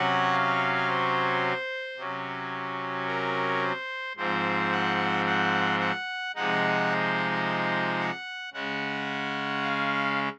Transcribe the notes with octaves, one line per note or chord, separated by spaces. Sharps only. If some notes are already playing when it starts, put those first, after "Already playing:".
Already playing: C3 F#3 C#4 F#5
F5
C5
C3 F#3 C#4
A#4
C5
G#2 F3 C4 C5
F#5
F#5
F#5
C3 F3 G#3 D#4 F#5
C5
F#5
C#3 G#3 C#4 F#5
F5